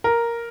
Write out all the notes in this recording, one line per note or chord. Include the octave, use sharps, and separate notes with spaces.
A#4